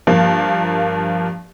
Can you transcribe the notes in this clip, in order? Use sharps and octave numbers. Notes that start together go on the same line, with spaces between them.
G2 F3 A#3